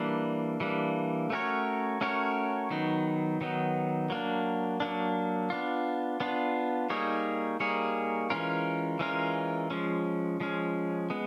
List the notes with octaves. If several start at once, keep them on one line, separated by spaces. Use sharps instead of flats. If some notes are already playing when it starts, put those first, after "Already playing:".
Already playing: E3 G3 A#3 D4
E3 G3 A#3 D4
A3 C#4 F#4 A#4 C#5
A3 C#4 F#4 A#4 C#5
D#3 F#3 B3 D#4
D#3 F#3 B3 D#4
F#3 A#3 D4
F#3 A#3 D4
B3 D4 F4
B3 D4 F4
G3 A#3 D#4 G#4 C#5
G3 A#3 D#4 G#4 C#5
E3 G#3 C#4 F4 A#4
E3 G#3 C#4 F4 A#4
F3 G#3 C#4
F3 G#3 C#4
G#3 B3